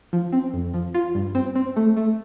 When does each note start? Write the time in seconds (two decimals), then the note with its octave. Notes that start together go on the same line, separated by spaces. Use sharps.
0.13 F3
0.32 C4
0.54 F2
0.74 F3
0.94 F4
1.15 G2
1.35 C4
1.55 C4
1.76 A3
1.97 A3